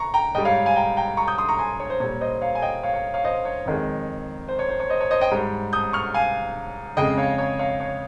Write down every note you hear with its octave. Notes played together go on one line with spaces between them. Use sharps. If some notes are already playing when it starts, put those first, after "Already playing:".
Already playing: A#5 C#6
G5 A#5
G#2 G3 D#5 G5
C#5 F5
F5 G#5
G5 A#5
G5 A#5
A#5 C#6
D#6 G6
C6 D#6
A#5 C#6
G#5 C6
C#5
C5
A#2 G3 C#5
C5 D#5
C#5 F5
G#5
D#5 G5
C#5 F5
C#5
C#5 F5
C5 D#5
C#5
F2 D#3 G#3
C5
C#5
C5
C#5
C5 D#5
C#5
C5 D#5
D#5 G5
G#2 G3
D#6 G6
C#6 F6
F5 G#5
F2 C#3 G#3 D#5 G5
C#5 F5
C#5
C#5 F5
C#5